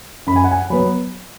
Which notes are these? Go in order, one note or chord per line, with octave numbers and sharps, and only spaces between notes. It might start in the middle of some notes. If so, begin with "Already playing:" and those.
F#2 B5
G#5
F#5
G#5
F#3 B3 B5